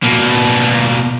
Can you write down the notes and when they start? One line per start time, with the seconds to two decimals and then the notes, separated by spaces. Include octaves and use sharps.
0.03 B2 A#3